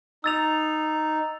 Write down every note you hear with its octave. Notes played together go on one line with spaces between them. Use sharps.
D#4 E6 A6 F7